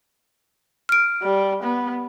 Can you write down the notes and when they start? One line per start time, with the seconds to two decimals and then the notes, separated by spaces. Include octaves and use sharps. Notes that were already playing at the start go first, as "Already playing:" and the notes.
0.89 F6 D7
1.22 G3
1.63 B3